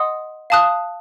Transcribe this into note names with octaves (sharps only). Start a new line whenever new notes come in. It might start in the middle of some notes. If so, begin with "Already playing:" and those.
Already playing: D#5 F#5 C6 D#6
F5 A5 D#6 F#6